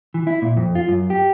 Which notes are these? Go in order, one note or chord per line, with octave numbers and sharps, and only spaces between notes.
E3
E4
A#2
F2
F4
F#2
G4